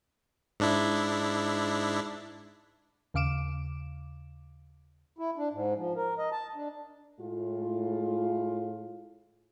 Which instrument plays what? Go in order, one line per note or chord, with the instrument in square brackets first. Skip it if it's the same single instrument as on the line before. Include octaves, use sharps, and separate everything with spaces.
[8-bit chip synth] G#2 D4 E4
[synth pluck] D#2 C#3 F5 D6 D7 E7
[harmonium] E4
D4
G#2
F3
A#4
D#5
A5
D4
[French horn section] A2 G#3 F4